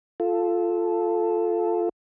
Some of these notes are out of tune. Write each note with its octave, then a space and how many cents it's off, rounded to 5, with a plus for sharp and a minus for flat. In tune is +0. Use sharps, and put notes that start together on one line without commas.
F4 +0 A4 -5